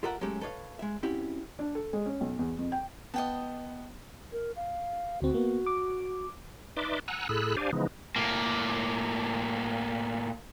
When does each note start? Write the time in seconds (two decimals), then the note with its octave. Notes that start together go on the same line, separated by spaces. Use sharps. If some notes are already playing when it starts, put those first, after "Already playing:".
0.03 F4 G4 A4 A#4 E5 F#5
0.21 F#3 G#3 A3 C#4 G4 A4
0.41 A4 B4 C#5 D5 F5
0.79 G#3 E5
1.03 C4 C#4 E4 F#4 G4
1.59 D4
1.75 A4
1.93 G#3
2.06 C#4
2.21 B1
2.39 E2
2.59 F2
2.72 G5
3.14 B3 D#5 G5 A5
4.32 A#4
4.56 F5
5.22 D2 C4 F#4
5.34 A#3 B3
5.66 D6
6.77 D#4 B4 D5 E5 C6 D6
7.08 F#5 G#5 A#5 E6 F#6
7.29 A2 G#4 A4 B5 E6 F#6
7.57 D4 G4 C5 D5 F5 G#5
7.73 C#3 E3 F3 G#3 B3 D#4
8.16 A2 A#3